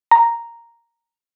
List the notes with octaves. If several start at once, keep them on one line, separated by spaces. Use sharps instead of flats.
A#5